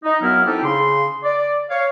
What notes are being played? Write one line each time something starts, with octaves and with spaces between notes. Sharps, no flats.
D#4
F#2 F#3 B3 E4 F5 F6
C4 D#4 E4 G4 A4
C#3 C6
D5
C#5 F5